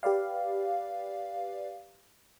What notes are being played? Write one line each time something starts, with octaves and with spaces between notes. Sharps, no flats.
G4 B4 D5 F5